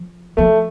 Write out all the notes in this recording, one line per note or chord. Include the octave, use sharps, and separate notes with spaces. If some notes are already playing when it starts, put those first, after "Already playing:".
Already playing: F3
F3 A3